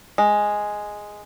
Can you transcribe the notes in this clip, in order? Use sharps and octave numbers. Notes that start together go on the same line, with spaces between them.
G#3